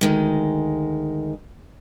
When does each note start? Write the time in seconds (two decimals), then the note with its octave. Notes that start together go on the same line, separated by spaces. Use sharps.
0.01 D2 D#3 G#3